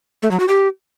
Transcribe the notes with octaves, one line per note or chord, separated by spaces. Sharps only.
A3
F#3
F#4
G4